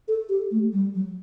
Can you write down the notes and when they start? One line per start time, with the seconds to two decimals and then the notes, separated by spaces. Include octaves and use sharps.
0.08 A4
0.29 G4
0.51 A3
0.72 G3
0.95 F#3